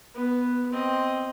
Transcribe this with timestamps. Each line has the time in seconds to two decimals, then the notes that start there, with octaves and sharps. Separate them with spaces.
0.14 B3
0.72 C4 D#5